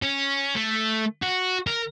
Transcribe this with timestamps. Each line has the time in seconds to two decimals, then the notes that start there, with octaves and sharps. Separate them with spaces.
0.02 C#4
0.55 A3
1.23 F#4
1.67 A#4